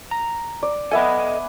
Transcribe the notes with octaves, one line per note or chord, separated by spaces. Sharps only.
A#5
D5
B3 A4 D#5 E5 G#5